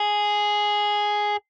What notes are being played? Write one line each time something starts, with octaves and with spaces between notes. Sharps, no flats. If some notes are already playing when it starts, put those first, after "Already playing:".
Already playing: G#4